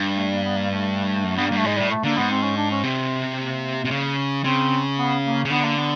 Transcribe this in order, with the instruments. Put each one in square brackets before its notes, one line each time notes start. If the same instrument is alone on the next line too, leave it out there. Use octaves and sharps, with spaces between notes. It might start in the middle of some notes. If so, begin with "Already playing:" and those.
Already playing: [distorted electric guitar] G2
[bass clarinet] A3
A#3
B3
A#3
A3
[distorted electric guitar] F#2
[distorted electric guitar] G2 [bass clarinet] B3
[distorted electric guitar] G2 [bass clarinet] A#3
[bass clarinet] A3
[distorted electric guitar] G#2 [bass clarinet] G#3
[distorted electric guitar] A2 [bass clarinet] G3
[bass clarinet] A3
[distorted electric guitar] D3 [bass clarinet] A#3
[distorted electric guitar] G#2 [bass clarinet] B3
[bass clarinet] C4
C#4
D4
C#4
[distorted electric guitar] C3 [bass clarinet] C4
[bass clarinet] A#3
[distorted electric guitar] C3
C#3
[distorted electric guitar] C#3 [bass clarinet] C4
[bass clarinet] B3
A#3
[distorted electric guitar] C#3
[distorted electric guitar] D3 [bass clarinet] B3
[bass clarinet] A#3
B3